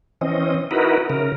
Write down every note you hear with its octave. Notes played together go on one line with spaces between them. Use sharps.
E3 C4 C#4 D#5
D#4 E4 F#4 A#4 B4
C#3 A#4